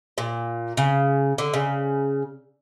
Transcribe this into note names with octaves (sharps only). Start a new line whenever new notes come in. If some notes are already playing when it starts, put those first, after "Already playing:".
A#2
C#3
D3
C#3